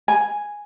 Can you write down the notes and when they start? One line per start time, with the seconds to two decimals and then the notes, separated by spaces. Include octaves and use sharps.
0.08 G#5